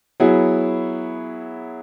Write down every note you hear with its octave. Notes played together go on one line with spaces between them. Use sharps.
F#3 B3 E4 G#4